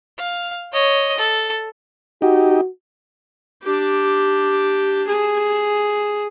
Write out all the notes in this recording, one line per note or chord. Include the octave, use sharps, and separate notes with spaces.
F5
C#5 D#5
A4
D#4 F#4 G4
D4 G4
G#4